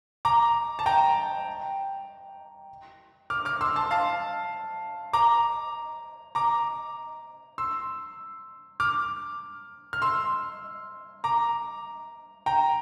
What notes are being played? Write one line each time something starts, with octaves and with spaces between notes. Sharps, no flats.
A#5 D6
A5
G5 A#5
D6 F6
D6 F6
C6 E6
A5 C6
F5 A5
A#5 D6
A#5 D6
C6 E6
D6 F6
F6
C6 E6
A#5 D6
G5 A#5